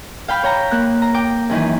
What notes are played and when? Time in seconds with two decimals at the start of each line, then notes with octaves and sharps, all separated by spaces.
0.28 F5 G5 B5 F6 G6
0.43 C#5 G5 A#5
0.71 A#3 F#6
1.02 A#5
1.14 G5 D6
1.50 F#2 D#3 E3